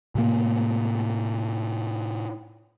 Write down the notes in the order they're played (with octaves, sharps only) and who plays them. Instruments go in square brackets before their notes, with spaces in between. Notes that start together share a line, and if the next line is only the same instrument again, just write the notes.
[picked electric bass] A2 C3 A#3